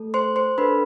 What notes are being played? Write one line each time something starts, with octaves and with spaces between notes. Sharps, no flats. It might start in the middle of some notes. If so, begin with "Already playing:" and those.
Already playing: A3 A4
C5 C6
C5 C6
D4 A4 B4 B5